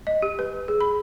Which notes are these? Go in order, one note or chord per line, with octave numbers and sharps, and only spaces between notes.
D#5
G4
B4
G#4
B5